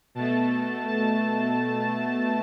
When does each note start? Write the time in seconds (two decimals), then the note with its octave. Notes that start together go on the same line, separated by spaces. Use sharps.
0.15 B2 A3 A5
0.88 A5